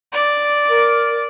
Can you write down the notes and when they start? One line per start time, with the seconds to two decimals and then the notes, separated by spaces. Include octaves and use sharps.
0.13 D5
0.69 A#4